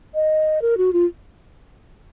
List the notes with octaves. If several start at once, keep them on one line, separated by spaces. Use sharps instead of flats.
D#5
A#4
F#4
F4